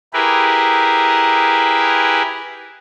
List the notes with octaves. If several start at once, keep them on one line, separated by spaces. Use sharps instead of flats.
E4 G4 G#4 A#4 B4